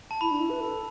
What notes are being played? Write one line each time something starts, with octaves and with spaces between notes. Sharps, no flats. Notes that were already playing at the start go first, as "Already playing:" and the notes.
A5
E4 B5
D4
E4
B4
A4